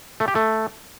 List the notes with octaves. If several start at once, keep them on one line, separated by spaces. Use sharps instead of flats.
A3
G4
A3